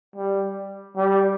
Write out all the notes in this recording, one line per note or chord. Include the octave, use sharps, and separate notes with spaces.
G3
G3